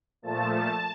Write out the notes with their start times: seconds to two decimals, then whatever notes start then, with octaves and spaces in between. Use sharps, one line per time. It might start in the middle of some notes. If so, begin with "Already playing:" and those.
0.22 A#2 F3 A3 A5
0.52 A5